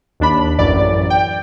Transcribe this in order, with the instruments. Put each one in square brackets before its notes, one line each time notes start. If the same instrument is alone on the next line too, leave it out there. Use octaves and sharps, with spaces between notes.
[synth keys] D#2 D4 B5
A1 F#2 D5
G5